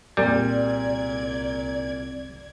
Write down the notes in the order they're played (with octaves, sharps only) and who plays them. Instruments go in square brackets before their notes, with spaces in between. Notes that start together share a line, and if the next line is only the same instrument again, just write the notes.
[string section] C2 D5 G#6 [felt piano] A#2 [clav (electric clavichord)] G3 [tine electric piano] C4 G#4